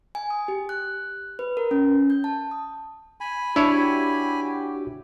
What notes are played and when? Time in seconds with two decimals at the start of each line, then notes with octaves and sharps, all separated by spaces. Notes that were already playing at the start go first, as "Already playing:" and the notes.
0.15 G#5
0.30 D#6
0.48 G4
0.69 F#6
1.39 B4
1.57 A#4
1.71 C#4
2.10 G6
2.24 A5
2.51 D#6
3.21 G#5 B5
3.56 D4 E4 F#4 G4 C#5